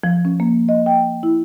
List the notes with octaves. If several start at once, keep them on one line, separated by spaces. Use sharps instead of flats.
F3
C#4
A#3
D#5
G5
E4